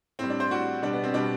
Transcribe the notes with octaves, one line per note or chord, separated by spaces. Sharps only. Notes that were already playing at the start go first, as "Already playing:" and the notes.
A2 G3 C4
D4
C5
A2 G3 F#4
B2 G3 D4
B3
C4
B2 G3 D4